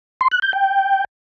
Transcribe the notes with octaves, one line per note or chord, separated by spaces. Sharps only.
C6
F#6
G6
G5